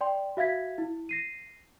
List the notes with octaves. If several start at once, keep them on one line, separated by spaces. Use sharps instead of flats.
D5 G5 C6
F#4 E5 F5 G#6 B6
E4
A#6 C7 D#7